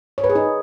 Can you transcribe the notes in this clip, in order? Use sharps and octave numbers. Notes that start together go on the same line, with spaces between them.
C#5
B4
G#4
D#4